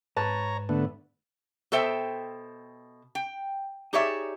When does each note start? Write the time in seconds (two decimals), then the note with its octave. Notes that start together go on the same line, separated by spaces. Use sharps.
0.17 G#2 B4 C#5 A5 A#5
0.69 D3 A3 B3
1.72 B2 A4 C5 E5 G5
3.15 G5
3.93 D#4 G4 G#4 C#5 D5 E5